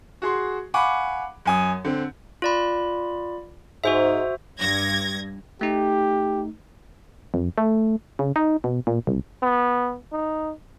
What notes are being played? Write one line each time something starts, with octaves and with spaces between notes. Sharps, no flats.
F#4 G#4 C6
F5 F#5 G#5 B5 C#6 D6
F#2 G#5 D#6
D3 C4
F4 D5 B5
G#2 F#4 C5 E5
G2 G#6 A#6
A3 D#4 G4
F2
A3
C#3
D#4
B2
A#2
C2
B3
D#4